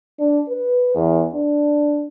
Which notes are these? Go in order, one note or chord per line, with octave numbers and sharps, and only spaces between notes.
D4
B4
E2
D4